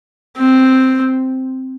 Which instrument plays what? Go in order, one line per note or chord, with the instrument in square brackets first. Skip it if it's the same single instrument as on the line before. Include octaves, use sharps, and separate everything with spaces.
[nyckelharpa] C4